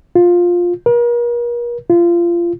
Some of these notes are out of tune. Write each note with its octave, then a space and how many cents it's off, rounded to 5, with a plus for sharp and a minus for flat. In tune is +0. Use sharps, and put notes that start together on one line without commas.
F4 +10
A#4 +40
F4 -25